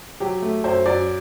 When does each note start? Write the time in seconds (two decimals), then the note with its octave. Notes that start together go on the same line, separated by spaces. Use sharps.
0.20 F#3 G4
0.42 A3
0.64 F#2 C5
0.86 F#2 D5